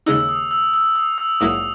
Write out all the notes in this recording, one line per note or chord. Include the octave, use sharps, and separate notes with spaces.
D#2 C#3 G#3 D#4 E6
D#6
E6
E6
D#6
E6
A#1 G#2 F#3 A#3 E4 D#6